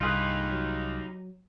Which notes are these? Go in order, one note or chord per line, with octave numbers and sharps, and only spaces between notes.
C2 G2 D#4 F4 G4 G#4 B4
F#3